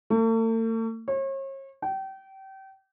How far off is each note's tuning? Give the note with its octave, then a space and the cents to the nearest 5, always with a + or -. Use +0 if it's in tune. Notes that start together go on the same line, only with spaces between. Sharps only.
A3 +45
C#5 -40
G5 -30